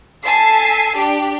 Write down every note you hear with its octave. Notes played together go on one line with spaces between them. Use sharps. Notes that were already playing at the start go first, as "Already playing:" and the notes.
A4 G#5 A5 B6 C7
D4 G4